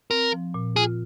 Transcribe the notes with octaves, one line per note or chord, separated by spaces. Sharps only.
C4 A#4
F3
A#2
F4 G#4